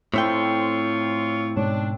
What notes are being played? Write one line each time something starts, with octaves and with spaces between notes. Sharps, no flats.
A2 C4 E4 F4 A4 C5 C#5 G5
G#2 B2 D4 C#5